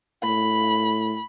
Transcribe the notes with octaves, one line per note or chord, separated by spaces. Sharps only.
A2 B5